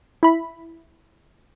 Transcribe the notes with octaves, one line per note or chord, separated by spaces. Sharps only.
E4 B5